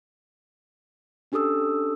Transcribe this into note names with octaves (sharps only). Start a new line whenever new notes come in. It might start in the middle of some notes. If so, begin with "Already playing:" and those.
C#4 D4 G4 A4 D#6 E6